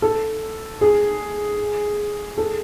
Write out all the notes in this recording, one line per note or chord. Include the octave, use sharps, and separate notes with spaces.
A4
G#4
A4